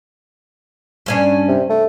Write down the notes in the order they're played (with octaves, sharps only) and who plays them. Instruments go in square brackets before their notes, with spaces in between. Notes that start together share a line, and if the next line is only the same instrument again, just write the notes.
[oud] G2 C#4 D4
[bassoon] C3
A3